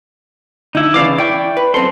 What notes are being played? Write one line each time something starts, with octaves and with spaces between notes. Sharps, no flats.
D3 D#4 E4
C#3 E3 D5 F5 D6
E4 D5 G5 C#6
B4
F#2 C4 A4 C6